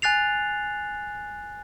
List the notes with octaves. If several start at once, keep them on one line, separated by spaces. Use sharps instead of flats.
G#5 F#6 A6 C7 F7